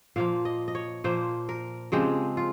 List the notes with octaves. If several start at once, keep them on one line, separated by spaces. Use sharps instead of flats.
A#2 F3 A#3 F5
D#5
D#5
C#5
A#2 F3 A#3 C5
A#4
C#3 F3 G#3 C4 G4
F4